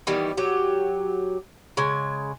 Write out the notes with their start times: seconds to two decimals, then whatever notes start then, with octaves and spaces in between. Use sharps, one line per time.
0.07 D#3 E3 G3 B3
0.37 F#3 G4
1.77 C#3 G#3 G#5